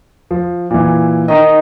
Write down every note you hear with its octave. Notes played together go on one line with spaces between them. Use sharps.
F3
A#2 E3
D#3 D#4 D#5